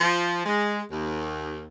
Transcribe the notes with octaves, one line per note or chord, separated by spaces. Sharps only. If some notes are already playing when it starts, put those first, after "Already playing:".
F3
G#3
D#2